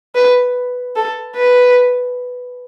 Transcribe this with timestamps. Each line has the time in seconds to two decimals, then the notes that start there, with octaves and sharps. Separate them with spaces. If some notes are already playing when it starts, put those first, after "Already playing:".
0.15 B4
0.96 A4
1.36 B4